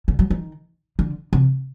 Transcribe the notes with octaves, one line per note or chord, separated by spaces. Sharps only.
D3
F#3
D#3
D3
C3